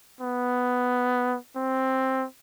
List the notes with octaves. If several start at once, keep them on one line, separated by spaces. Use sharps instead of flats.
B3
C4